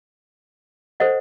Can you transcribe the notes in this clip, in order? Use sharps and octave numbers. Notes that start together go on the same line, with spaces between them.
A4 C5 D#5 F#5